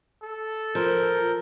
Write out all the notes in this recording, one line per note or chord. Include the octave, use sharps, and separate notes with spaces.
A4
F3 A#4 G6